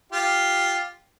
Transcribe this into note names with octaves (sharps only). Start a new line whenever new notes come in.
F4 G4